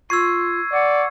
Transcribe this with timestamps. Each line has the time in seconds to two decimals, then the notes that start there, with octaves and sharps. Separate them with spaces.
0.10 F4 C#6 E6 G#6 C7
0.72 D5 F#5